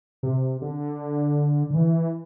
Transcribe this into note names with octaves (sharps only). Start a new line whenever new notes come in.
C3
D3
D3
E3